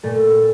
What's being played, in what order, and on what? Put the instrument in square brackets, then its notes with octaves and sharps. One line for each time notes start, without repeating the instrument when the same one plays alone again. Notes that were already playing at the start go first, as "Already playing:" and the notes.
[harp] A#2 A3 A4